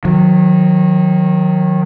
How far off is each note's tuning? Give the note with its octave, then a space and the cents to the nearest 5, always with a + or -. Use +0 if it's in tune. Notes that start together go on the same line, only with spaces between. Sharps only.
D#3 +0 F#3 -30